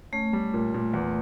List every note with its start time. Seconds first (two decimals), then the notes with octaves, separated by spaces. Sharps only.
0.12 A3 C#4
0.33 G3
0.54 A#2
0.74 A#2
0.94 E2